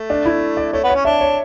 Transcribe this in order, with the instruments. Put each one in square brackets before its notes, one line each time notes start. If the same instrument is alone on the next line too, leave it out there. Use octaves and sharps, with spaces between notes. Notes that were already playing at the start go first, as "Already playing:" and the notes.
Already playing: [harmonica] A3
[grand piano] D4
E4
D5
[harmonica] A3 [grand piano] C#5
[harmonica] B3
[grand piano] C#5
[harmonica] C#4
[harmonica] D4 [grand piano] E5
[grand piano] C#5